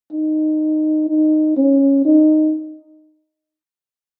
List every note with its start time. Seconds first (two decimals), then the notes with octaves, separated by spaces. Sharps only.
0.12 D#4
1.09 D#4
1.57 C#4
2.05 D#4